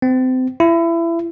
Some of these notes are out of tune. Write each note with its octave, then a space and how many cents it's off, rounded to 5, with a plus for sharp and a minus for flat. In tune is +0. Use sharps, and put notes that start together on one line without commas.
C4 -30
E4 +25